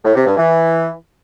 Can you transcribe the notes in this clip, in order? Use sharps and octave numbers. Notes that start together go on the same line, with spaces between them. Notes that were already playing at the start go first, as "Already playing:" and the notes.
A2
C3
G2
E3